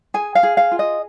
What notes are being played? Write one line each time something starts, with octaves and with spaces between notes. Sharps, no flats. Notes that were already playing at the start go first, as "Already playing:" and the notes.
G#4 G#5
F5
G#4
F5
F4
D#5